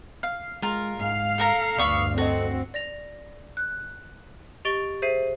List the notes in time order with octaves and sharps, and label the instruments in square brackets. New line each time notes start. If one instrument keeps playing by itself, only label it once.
[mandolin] F5
[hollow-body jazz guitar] G#3 [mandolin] F4 A#4
[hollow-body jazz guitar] G#2 [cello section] F5
[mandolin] A4 A#4 A#5
[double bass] D2 G2 [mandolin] B3 C#6 E6 [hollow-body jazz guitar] D5
[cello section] C4 [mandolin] F#4 [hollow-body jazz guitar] A4 D#5
[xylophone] D5 A#6 F7
F#6
G4 D#5 C#6 A6 D7 G7
G#4 C5 E5 C7 D#7